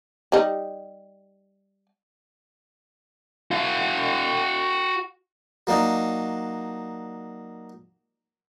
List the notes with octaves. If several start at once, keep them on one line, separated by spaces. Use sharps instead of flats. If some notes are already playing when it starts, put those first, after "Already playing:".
G3 D#4
F#4 F5
F#3 A#3 D4 D#4